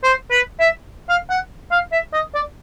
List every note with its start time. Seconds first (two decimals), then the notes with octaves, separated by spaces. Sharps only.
0.04 C5
0.31 B4
0.60 E5
1.09 F5
1.30 F#5
1.71 F5
1.92 E5
2.14 D#5
2.35 D5